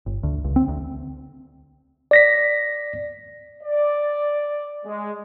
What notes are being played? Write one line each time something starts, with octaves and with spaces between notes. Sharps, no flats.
G1
D2
C#2
C4
D2
D5 A#6 B6
D5
G#3